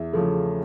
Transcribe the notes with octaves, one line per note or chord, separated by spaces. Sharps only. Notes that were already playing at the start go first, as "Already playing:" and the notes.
Already playing: E2 E5
C#3 F3 A3